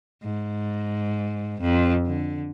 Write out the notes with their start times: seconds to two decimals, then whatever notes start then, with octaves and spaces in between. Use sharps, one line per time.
0.23 G#2
1.61 F2
2.06 D3